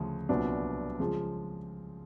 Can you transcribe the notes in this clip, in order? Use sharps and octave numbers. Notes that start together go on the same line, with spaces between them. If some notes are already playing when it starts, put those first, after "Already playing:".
Already playing: D2 C#3 F3
C2 A#2 F#3 B3 D4
C#3 F3 G#3